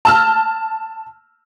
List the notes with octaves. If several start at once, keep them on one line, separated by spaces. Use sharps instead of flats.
A5 E6 F6